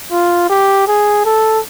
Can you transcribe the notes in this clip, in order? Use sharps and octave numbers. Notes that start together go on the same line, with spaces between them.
F4
G4
G#4
A4